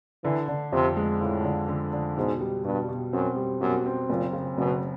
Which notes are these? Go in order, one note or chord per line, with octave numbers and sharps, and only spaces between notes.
D3 E3
D3
F2 C3
G#3
A2 F3
D3
D3
D3
G#2 B2
G3
G2 B2
B2
F#2 C4
G3
F#2 B2
C4
F#1 A#2
C#3
F#1 B2